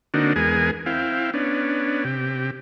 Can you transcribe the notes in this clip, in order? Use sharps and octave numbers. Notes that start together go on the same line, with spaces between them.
D3 A#3 C4 D4 D#4 F#4
E2 G#3 B3 G#4 A#4 G#5
C4 E4 F5 G5
B3 C#4 D4
C3 G4